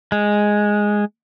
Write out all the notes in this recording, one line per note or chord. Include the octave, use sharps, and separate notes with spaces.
G#3